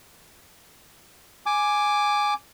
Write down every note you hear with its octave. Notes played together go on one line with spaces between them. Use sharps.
G#5 D6